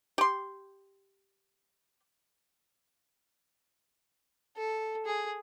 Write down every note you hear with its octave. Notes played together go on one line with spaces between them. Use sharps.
G4 C6
A4
G#4